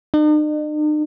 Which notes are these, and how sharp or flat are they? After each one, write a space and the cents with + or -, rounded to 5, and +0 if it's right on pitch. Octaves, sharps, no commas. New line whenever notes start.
D#4 -45